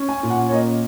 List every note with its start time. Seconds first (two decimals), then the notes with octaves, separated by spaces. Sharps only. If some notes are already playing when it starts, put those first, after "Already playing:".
Already playing: C#4
0.09 G#5
0.23 A#2
0.30 F#5
0.48 C#5
0.52 A#3 D#5